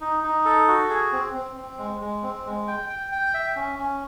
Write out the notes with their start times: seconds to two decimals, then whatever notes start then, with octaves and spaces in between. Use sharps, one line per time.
0.01 D#4
0.23 D#4
0.45 A4
0.68 F#4
0.90 G#4
1.12 C4
1.34 C4
1.56 C4
1.78 G#3
2.01 G#3
2.23 C4
2.46 G#3
2.68 G5
2.89 G5
3.12 G5
3.34 E5
3.56 C#4
3.79 C#4